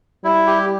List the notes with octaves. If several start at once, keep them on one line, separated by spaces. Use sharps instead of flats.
G3 E4
G4